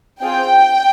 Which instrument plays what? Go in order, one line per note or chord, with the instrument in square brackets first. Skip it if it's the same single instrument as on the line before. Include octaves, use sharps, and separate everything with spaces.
[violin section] C4 F4 G#4 G5